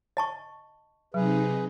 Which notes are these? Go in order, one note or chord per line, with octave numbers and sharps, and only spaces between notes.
D#5 A5 C#6
C3 F#3 D#4 G#4 B4